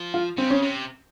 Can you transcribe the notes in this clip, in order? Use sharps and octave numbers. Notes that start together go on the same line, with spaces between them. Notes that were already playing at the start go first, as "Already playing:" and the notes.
Already playing: F3
F4
C#3 C4
C#4
C3